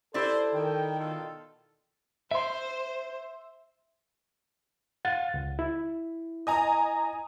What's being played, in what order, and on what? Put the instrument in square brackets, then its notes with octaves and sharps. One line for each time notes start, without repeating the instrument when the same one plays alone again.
[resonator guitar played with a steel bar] E4 G4 D5 [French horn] A4 [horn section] C5
[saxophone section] D#3 [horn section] G5
[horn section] B2 F4 A4
[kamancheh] C5 [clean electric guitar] E5 C6
[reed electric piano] F5 F#5 A6
C#2
E4
[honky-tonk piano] D#5 G#5 A#5